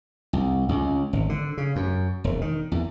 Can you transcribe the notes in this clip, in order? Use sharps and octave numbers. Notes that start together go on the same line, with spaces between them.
C2
C#2
G#1
D3
C#3
F#2
E1
D#3
E2